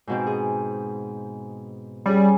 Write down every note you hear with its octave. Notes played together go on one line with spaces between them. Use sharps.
G#2 B2 C4
G#4
G3 C#4 G#4